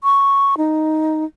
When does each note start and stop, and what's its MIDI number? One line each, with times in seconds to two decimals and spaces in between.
0.04 0.55 85
0.58 1.25 63